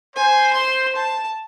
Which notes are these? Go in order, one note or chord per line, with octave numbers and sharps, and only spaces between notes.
C5 G#5
C6
A5